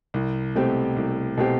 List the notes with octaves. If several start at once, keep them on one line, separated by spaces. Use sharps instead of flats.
C2
B2 A3 C4 G4
C2
B2 A3 C4 G4